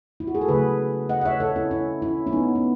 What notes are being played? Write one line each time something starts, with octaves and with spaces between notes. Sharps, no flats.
E4
F#4
G#4
A4
C#3 F#3 A3 G#4 B4
D#5 F#5
F#5
C#5 E5
A4 C#5
C#4 E4
C#4 E4
C#4 E4
C#4
B3 D#4
B3